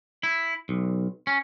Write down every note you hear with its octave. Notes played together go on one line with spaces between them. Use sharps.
E4
B1
C#4